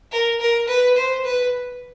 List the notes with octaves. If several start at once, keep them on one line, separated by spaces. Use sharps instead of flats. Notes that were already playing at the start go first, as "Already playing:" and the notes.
A#4
A#4
B4
C5
B4